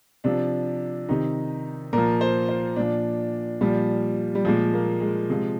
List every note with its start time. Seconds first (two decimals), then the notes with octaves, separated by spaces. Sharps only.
0.24 C3 F3 D4
1.09 C3 D#3 D#4
1.93 A#2 F3 A#4
2.21 C5
2.49 C5
2.76 A#2 F3 D4
3.61 A#2 F3 G3
4.35 G3
4.45 A#2 F3 G#3
4.74 A#3
5.01 G#3
5.29 C3 F3 G#3